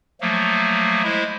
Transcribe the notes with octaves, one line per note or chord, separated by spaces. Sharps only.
F3 F#3 A3 A#3
G#3 E4 C5